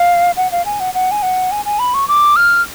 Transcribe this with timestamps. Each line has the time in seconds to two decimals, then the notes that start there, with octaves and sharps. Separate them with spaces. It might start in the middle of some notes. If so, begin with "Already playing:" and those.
Already playing: F5
0.37 F#5
0.51 F5
0.66 G#5
0.80 F#5
0.94 F#5
1.11 G#5
1.23 F#5
1.51 G#5
1.65 G#5
1.79 B5
1.94 C#6
2.08 D6
2.36 F6